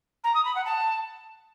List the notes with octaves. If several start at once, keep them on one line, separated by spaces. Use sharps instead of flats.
A#5
D#6
B5
F#5
A5